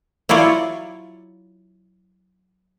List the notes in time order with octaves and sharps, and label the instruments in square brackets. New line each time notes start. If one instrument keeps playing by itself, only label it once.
[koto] F#3 E4 F4 C#5 D5